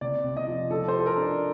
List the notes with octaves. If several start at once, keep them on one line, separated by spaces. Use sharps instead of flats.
C3 D5
C3
D#5
F3
F3 A4
C5
G4
A4
A#4
D4
D5